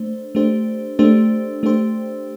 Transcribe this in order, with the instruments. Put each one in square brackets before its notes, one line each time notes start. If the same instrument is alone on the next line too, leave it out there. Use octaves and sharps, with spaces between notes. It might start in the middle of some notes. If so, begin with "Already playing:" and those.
Already playing: [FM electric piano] A3 D4 C5
A3 D4 G4 C5
A3 D4 G4 C5
A3 D4 G4 C5